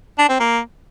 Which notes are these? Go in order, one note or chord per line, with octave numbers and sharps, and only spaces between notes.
D4
C4
A#3